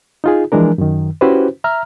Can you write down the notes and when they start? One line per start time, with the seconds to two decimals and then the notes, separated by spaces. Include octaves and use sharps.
0.24 D#4 F4 G#4
0.52 E3 F3 G#3 D4 A#4
0.78 F#2 D#3
1.21 C#4 E4 F#4 G4 B4 C5
1.64 E5 A#5 F6